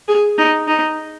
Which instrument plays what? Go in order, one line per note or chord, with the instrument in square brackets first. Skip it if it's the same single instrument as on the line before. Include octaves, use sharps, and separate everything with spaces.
[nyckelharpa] G#4
D#4
D#4